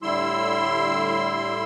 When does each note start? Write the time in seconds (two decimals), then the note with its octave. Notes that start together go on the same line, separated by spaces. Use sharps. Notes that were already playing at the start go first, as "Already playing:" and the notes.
0.02 A2 D3 G3 E4 C6 E6